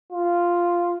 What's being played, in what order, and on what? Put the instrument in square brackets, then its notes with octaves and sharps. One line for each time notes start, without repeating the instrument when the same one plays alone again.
[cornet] F4